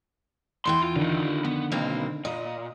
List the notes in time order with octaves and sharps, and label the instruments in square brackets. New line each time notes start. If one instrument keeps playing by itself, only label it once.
[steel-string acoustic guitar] E2 E3 G5 [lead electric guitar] C6
[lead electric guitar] F4
[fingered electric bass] D3 D#3 [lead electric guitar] D#4 F4
[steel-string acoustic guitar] F2 [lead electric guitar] B3
[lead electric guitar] B1 [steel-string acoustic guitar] A#3 C4
[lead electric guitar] A#2 [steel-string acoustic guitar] D#5